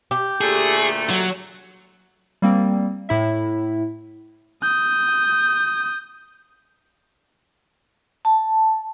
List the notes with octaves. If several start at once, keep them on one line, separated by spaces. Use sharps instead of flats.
G4
D2 A#2 A3 G#4
F#3
G3 A#3 C4
A2 E4 E5
D#6 G6
A5